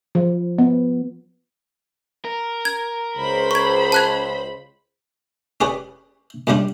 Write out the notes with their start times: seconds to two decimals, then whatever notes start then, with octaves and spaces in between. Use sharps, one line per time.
0.15 F3
0.58 B3
2.25 A#4
2.65 G#6
3.18 C#2 C5 B5
3.51 C#6 G#6
3.92 A5 F#6 G#6
5.61 C#4 G4 G#4 B4 D5
6.47 F#2 C#3 G3 D4 F4